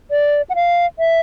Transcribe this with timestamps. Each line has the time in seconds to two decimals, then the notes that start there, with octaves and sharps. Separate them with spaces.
0.11 D5
0.50 F#5
0.55 F5
0.99 E5